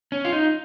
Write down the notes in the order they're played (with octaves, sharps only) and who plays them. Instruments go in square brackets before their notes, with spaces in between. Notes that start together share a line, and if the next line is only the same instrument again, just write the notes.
[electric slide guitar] C#4
F4
D#4